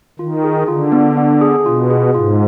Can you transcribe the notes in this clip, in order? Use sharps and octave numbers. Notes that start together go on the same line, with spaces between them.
D#3 F4
G#4
D3 F4
B3
B3
G#4
B2 F4
G#4
G#2 F4